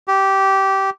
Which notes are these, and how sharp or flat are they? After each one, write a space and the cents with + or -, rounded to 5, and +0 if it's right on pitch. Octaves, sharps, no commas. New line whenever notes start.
G4 -15